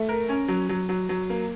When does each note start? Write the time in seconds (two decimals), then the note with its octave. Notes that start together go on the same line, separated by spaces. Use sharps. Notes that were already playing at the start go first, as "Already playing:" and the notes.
Already playing: A3
0.09 A#4
0.29 C#4
0.48 F#3
0.69 F#3
0.89 F#3
1.09 F#3
1.30 A#3